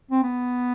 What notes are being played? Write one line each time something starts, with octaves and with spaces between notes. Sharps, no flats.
C4
B3